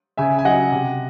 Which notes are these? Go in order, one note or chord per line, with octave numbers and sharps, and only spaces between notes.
C#3 E5 G#5
G#5
F#3 D#5 F#5
C3